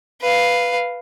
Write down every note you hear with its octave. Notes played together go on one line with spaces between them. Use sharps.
B4 F5